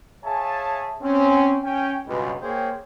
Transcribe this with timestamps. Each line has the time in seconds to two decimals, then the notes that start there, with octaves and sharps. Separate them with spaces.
0.25 G#4 C#5 E5 F5 G#5 A5
1.03 C4 C#4
1.63 C#4 G5
2.07 C#2 G2 B2
2.42 A#3 G#4 C5 C#5 G5